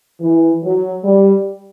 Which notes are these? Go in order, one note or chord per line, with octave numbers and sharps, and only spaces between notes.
E3
F#3
G3